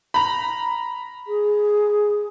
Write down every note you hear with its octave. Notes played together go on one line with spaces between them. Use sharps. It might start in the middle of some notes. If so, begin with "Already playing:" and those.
A#5 B5
G#4